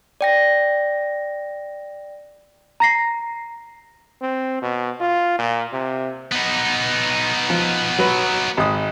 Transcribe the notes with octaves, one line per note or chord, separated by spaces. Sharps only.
D5 G5 A#6
A#5 A#6 C7
C4
B2
F4
A#2
C3
B3 D#4
F3
F#3 B4
G#1 D#6